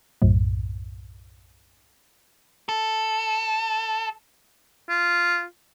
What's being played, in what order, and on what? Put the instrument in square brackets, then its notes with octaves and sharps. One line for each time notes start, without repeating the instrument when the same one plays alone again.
[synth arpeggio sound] B1 F#2 A2
[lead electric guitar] A4
[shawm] F4